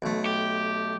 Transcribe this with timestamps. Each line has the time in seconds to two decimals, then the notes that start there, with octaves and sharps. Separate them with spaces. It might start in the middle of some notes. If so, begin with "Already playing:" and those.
0.02 B1 A3
0.26 G4